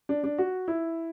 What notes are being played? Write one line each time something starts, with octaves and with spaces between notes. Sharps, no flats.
D4
D4
F#4
E4